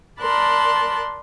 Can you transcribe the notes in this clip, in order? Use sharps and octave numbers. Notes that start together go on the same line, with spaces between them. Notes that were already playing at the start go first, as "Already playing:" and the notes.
A#4 D5 A5 B5 C6 F#6